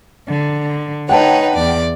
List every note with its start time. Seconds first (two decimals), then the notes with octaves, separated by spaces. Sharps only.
0.26 D3
1.09 D#4 B4 C#5 F#5 G5 A5
1.54 E2 D5